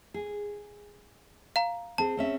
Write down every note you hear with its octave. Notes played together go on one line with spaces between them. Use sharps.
G#4
F5 A#5
C4 G#4 A5
C4 C#4 E5